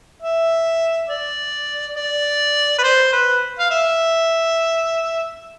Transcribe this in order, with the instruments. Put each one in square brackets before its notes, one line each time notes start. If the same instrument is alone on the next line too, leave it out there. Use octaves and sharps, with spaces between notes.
[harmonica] E5
D5
D5
B4
C5
B4
F5
E5